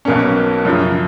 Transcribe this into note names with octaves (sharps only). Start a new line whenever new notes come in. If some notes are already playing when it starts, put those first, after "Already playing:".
B1 B2 A#3 C#4
F#2 C#3 F3